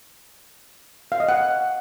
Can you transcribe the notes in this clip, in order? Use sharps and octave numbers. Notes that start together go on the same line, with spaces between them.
F5
D#5
F#5